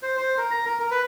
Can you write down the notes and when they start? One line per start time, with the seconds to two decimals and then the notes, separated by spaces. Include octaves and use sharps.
0.03 C5
0.17 C5
0.38 A#4
0.51 A#5
0.66 A#4
0.80 A#4
0.91 B4